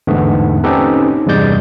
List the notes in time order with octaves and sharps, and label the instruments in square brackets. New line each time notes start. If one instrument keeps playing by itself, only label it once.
[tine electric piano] A1 E2 G#2 D3 A3 B3
C4 C#4 D#4 G4 A4 B4
E2 G2 C3 G#3 D5 G6